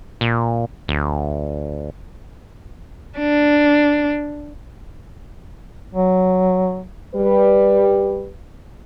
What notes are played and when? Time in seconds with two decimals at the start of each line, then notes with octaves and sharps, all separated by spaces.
0.21 A#2
0.88 D2
3.18 D4
5.94 F#3
7.15 G3 B4